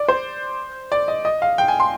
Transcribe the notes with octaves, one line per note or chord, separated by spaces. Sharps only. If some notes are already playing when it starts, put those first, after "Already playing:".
Already playing: D5
C5
D5
D#5
D#5
F5
G5
G#5
C6